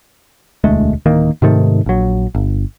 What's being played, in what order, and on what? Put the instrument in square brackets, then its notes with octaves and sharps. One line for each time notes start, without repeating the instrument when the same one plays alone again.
[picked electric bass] E1 D2 G#3 A3
D1 D#3 A#3
G#2 C3 D#3 A3
A#1 F#3
G1